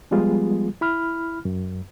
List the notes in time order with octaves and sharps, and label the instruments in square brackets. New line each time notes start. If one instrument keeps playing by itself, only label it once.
[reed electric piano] F3 G3 G#3 B3 F4 G#4
E4 B5 F6
F#2